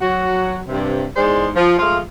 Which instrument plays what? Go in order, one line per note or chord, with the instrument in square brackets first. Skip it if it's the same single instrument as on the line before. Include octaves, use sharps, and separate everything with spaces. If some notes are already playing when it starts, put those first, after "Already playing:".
[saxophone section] F#3 F#4
G2 C3
E2 G#2 G#3 G#4 C5 D5
F3
F3 G#3 A3 F4